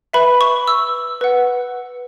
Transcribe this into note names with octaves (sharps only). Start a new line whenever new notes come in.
B4 E5 B5
C#6
E6
B4 F#5